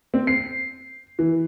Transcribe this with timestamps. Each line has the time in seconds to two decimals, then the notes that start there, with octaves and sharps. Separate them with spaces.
0.14 C4
0.27 C7
1.19 E3